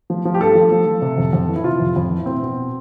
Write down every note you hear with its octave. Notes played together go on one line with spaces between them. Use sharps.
F3
F3
G4
G2 A4
F3
F3
F3
C3
F2
F2
E3
E4
C3 F4
F2
F2 E4
E3
B2 C4
B2